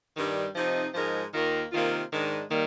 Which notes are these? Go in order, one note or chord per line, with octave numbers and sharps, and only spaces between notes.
G2 D#3 G3 D4 G4
C3 F3 C4 D#4
G#2 F3 G#3 D#4 A#4
D#2 D#3 A#3 F4 A#4
C3 D#3 A#3 F4
G#2 D#3 G#3 D4
D#3 G3 A#3